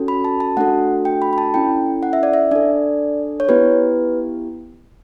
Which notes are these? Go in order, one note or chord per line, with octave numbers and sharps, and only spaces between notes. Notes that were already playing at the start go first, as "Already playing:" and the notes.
Already playing: C#4 F#4 A4
B5
A5
A5
A3 D4 F#4 A4 F#5
G5
B5
B5
A5
C#4 E4 A4 G5
F#5
E5
D5
E5
D4 A4 D5
C#5
B3 E4 G4 B4